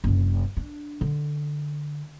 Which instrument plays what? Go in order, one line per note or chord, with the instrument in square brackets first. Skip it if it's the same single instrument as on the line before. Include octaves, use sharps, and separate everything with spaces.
[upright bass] F#1 C3
D4
D3